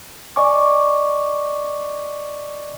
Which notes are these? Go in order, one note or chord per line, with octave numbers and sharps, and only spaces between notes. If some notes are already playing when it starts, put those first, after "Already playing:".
D5 D#5 G#5 C#6 D6